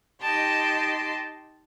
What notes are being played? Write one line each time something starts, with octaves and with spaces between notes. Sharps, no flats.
D#4 G4 D#5 G5 A5 C6